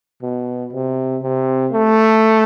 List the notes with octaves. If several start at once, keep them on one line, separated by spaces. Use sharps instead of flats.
B2
C3
C3
A3